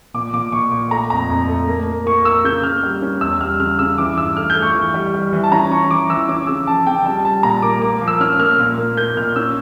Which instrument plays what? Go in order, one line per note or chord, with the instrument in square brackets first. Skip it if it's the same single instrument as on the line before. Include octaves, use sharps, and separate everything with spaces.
[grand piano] A#2 D6
A#2 D6
A#2 C#6
A#2
A3 A#5
F2 A#5
F2
A3
A#3
A#3
A#3 C#6
A#3 E6
C#3 G6
A#3 F6
G3
C#4
E2 E6
G3 F6
C#3 F6
C#3 E6
E3 D6
G2 E6
A3 F6
G6
A3
C#6
E3
G3
G3
E3
A5
C#4 A#5
C#4 C#6
E3 D6
E3 E6
C#4 D6
C#3 E6
F3 A5
C#3 G5
G3 A5
G3 A5
A#2 A#5
A#3 D6
A#3 D6
F3
E6
C#4 F6
A#3 F6
A#2
A#3
A#3 G6
A#2 F6
C#4 E6